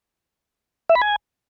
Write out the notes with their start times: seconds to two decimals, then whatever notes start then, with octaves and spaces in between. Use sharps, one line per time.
0.89 E5
0.95 B5
1.02 G#5